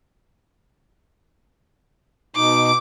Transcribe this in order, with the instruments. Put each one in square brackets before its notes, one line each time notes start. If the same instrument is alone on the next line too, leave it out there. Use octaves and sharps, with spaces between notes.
[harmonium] B2 D#4 [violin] D6